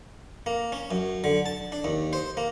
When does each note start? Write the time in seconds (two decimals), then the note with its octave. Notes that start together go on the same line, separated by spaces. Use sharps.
0.46 A#3
0.72 C#4
0.91 F#2
1.24 D3
1.46 A5
1.72 D4
1.84 D#2
2.13 C5
2.37 A#3